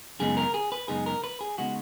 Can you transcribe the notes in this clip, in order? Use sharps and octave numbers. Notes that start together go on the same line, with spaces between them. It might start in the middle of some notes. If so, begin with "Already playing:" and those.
F#2 C#3 G#3 B3 D#4 G#4
A#4
G#4
B4
F#2 C#3 G#3 B3 D#4 G#4
A#4
B4
G#4
C#3 G#3 B3 D#4 F#4